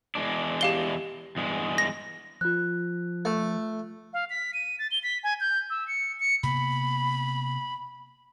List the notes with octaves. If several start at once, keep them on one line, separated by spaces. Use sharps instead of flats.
E2 G#3 D4
G4 F5 G7
E2 G2 G#3
A#6
F3 F4 F#6
A3
F5
B6
D#7
A6
G7
B6
G#5
G6
E6
C#7
C#7
C3 A#3 B3 B5